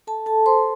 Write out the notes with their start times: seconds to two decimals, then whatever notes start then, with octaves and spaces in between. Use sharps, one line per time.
0.07 A4 A5
0.26 A4 A5
0.46 C5 C6